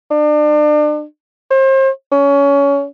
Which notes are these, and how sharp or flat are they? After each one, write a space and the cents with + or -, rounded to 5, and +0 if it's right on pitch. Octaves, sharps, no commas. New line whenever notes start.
D4 +35
C5 +35
C#4 +25